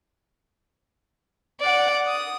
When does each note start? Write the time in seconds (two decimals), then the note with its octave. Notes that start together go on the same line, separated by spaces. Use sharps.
1.60 D5 F#5
2.07 D#6